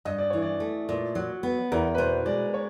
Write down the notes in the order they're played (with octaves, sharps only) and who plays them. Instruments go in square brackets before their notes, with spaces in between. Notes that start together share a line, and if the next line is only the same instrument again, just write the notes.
[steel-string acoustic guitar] G2 [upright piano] D#5
[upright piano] D5
[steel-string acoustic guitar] E3 [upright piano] C#5
[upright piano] D5
[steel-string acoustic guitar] A3
A#2
F#3
B3
[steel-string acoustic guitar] E2 [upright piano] A#4
[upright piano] B4
[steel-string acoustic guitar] B2 [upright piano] C5
[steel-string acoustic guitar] G#3 [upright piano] D5
[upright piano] C#5